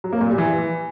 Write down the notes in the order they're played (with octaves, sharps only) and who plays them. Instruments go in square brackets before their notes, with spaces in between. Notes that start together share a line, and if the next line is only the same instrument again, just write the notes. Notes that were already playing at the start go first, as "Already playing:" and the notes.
[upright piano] F#3
A#3
A#2
G3
E3